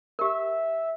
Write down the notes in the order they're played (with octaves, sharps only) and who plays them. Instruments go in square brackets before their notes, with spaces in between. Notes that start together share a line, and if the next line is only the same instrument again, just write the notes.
[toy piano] G4 A#4 [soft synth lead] E5